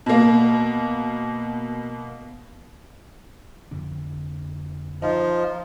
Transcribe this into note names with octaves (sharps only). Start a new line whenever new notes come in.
B2 A#3
F2 D3 D4
F3 D#4